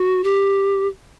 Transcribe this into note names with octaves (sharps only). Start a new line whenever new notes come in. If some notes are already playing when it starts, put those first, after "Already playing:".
Already playing: F#4
G4